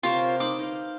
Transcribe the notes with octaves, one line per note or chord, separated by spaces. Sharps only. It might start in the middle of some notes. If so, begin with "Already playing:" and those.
C3 F4 G4 A#4 C5 C#5
D#4 C5 B5 D6
D#4 C5 F5